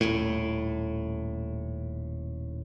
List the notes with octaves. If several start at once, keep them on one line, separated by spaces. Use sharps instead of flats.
D#1 A2